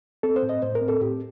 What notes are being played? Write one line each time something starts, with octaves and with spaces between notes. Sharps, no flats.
C4 A4
C5
A2
D#5
A2 C5
A#4
C4
A4
A2 G4